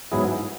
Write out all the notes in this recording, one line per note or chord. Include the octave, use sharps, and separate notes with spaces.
G#2 F#3 B3 E4 G#4